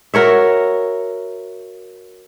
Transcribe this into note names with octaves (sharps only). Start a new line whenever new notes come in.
F#4 A#4 C#5 E5